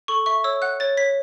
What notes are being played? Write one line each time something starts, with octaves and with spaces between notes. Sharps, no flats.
A4 C#6
E5 C#6
C#5 E6
F#5 F#6
C#5 A6
C#5 B6